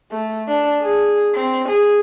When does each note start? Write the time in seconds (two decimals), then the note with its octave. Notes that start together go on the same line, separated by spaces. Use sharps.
0.11 A3
0.48 D4
0.81 G#4
1.35 C4
1.69 G#4